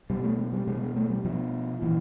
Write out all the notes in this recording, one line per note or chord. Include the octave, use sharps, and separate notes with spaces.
B2 G3
A3
G#3
G3
B2 G#3
G#3
A3
G3
B2 F3
A#2 E3